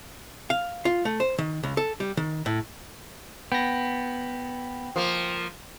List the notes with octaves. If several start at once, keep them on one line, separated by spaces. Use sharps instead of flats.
F5
F4
A3
C5
D#3
C#2
A4
G3
D#3
A2
B3 G5 A#6
F3 A#3